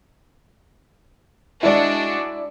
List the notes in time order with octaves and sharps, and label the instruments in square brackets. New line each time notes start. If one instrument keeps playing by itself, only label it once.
[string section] G#3 D4 F#4 [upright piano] E4 D5